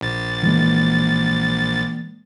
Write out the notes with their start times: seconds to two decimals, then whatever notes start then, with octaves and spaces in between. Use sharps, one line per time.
0.01 A#1 A6
0.43 E3 G#3 A#3